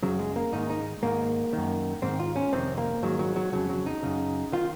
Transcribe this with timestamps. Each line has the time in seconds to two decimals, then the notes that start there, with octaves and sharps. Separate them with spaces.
0.03 F#2 C#3 F#3
0.19 G#3
0.36 A#3
0.53 G#2 D#3 D#4
0.70 D#4
1.03 G#2 D#3 A#3
1.53 F#2 D#3
2.02 G#2 D#3 C4
2.19 F4
2.36 C#4
2.53 F2 C3 D#3 C4
2.78 A#3
3.03 G#2 D#3 F#3
3.19 F#3
3.36 F#3
3.52 F2 C#3 F#3
3.69 F#3
3.86 D#4
4.03 F#2 C#3
4.52 D#3 F4